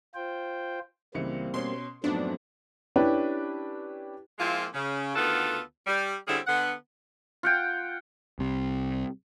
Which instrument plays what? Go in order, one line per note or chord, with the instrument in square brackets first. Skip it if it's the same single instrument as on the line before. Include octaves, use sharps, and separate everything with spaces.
[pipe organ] F4 C5 G5
[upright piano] C#2 E3 C#7 [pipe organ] G3 A#3 C4
[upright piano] B2 C#4 [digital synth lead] C6
[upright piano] F2 G#2 B3 [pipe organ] F#3 A3 C4 [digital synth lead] D4
[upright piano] C#4 D4 E4 G4 B4
[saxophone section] F3 G#3 A#3 C4 E4 F4
C#3
D2 D#3 B3 F4 A4 F#5
G3
D3 G3 C4 C#4 E4 G#4
D3 B3 F#5
[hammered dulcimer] F4 F#5 G5
[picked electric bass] C2 C3